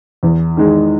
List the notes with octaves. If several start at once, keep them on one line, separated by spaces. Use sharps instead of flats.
E2
D#3 G#3